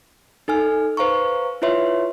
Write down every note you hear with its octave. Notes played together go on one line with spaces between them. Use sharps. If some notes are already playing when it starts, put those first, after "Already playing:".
D#4 A4 G#5 F6
B4 C5 F5 A#5 C#6
E4 F4 B4 C#5 E5 C6